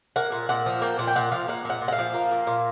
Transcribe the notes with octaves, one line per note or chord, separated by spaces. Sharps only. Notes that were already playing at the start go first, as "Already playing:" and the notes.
A#3 F#5
A#2
A#2 F#5
F3
A#3 G5
A#2 F#5
G5
A#2 F#5
F3 F5
A#3 F#5
A#2 F#5
A#2
F#5
F5
F3
A#3
A#2
A#2